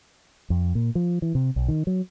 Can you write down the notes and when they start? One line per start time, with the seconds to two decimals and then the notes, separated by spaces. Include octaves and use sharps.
0.50 F2
0.75 A#2
0.95 F3
1.22 E3
1.35 C3
1.56 B1
1.68 D#3
1.87 F#3